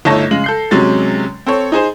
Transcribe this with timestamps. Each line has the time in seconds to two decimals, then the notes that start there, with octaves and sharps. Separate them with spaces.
0.05 G1 A3 D#4 C#5 A5 A#6
0.31 C#3 G#3 F#7
0.44 A4 G6 C7
0.71 C3 F#3 G#3 C#4 A6
1.47 C4 A4 C#5
1.72 D#4 G#4 C5